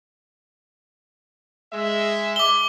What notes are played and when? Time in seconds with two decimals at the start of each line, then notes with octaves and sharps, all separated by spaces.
1.73 G#3 E5
2.36 D6 G7